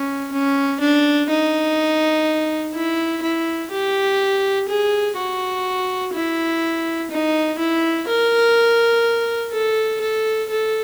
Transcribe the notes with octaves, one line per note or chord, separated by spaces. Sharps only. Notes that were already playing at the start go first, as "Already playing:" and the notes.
Already playing: C#4
C#4
D4
D#4
E4
E4
G4
G#4
F#4
E4
D#4
E4
A#4
A4
A4
A4